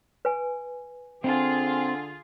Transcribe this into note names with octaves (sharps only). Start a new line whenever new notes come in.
B4 G#5
D3 C4 F4 G#4